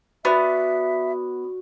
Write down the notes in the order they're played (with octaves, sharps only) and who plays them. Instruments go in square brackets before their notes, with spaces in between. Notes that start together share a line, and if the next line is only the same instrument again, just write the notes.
[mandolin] B3 [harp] F#4 D5 [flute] E5